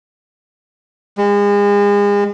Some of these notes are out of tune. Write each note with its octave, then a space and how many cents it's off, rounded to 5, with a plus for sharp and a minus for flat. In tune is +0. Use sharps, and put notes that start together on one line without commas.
G#3 -35